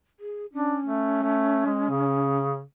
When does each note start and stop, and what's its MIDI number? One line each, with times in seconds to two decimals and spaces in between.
0.20 0.46 68
0.53 2.39 61
0.53 0.76 62
0.86 1.22 57
1.23 1.66 57
1.66 1.89 56
1.90 2.61 49